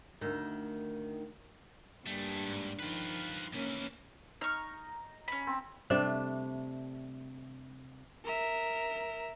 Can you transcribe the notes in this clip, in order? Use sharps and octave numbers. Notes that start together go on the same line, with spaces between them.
D2 D#3
G2 G3 A3 A#3 G#4
G#2
D#3 F3 F4 B4
C#2 E3 A#3 C#4
D#4 A#5 C#6 F6
C#4 B5
C4
C3 G3 A3 D4
A#4 E5